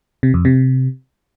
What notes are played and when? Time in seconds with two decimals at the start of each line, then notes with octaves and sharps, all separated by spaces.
0.23 C3
0.34 F2
0.45 C3